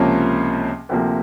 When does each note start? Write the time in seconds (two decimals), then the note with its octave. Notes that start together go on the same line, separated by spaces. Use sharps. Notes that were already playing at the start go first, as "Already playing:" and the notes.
Already playing: C#2 C3 F3 A#3 C#4
0.89 D2 C3 F3 A#3